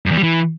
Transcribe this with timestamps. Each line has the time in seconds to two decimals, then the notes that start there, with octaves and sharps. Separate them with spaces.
0.06 F#2
0.12 E2
0.17 G3
0.23 E3